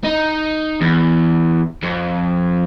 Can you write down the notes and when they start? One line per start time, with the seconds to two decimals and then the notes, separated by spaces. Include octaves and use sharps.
0.04 D#4
0.81 E2
1.83 F2